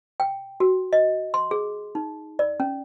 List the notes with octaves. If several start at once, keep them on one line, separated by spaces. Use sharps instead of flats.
G5
F#4
D#5
C6
G#4
D#4
D5
C#4